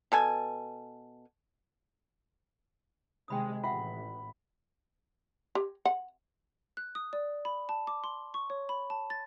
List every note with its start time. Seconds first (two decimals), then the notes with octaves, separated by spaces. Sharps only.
0.12 B2 A4 G#5
3.28 C3 D#3 G#3 G5 B5 D#6
3.64 A1 F4 E5 F#5 B5
5.55 G4
5.85 F#5
6.77 F#6
6.95 D#6
7.13 D5
7.45 B5
7.69 A5
7.87 D6
8.04 C6
8.34 C#6
8.50 C#5
8.69 B5
8.90 A5
9.10 A6